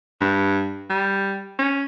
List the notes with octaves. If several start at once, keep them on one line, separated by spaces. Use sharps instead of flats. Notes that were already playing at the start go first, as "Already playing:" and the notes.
G2
G3
C#4